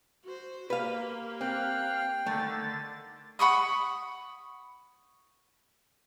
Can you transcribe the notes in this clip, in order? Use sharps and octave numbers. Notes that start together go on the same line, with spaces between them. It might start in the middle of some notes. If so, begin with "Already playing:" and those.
F#4 C5
A#3 G4 B4 F5
C4 F5 G5 F#6
D3 D#3 A3 A6
F#5 B5 C#6 D#6